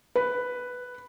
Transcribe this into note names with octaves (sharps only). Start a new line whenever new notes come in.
B4